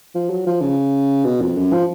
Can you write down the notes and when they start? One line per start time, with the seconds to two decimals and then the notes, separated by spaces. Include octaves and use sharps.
0.15 F3
0.30 F#3
0.47 F3
0.62 C#3
1.25 B2
1.41 F2
1.57 F#2
1.73 F3